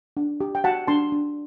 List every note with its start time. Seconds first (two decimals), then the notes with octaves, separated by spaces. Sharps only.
0.17 D4
0.41 G4
0.55 G5
0.64 F#4 F#5 A5
0.87 D4 A5 C6
1.12 D4